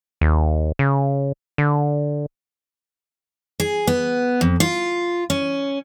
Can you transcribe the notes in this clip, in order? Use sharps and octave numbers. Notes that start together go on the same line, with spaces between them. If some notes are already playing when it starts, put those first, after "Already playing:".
D#2
C#3
D3
G#4
B3
F2
F4
C#4